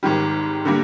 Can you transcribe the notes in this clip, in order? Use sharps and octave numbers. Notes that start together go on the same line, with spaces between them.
G#1 G#2 D#3 G3
D3 G3 A#3